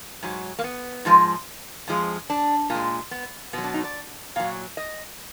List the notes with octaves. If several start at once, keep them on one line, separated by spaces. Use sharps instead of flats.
G#2 F#3
A#3
B3
G#2 F3 G#3
F2 F3 G#3
D4
A#2 G#3
B3
B2 F#3 B3
D4
D#4
D5
A#2 F#3 F5
D#5